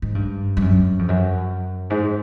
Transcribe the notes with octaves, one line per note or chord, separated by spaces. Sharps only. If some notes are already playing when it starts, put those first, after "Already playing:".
G#2
G2
G2
F#2
F2
F#2
G#2